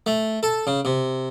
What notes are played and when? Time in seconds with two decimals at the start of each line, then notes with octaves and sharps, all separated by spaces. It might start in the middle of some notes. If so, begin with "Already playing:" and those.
0.06 A3
0.43 A4
0.67 C#3
0.85 C3